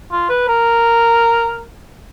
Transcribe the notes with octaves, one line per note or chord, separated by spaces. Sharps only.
F4
B4
A#4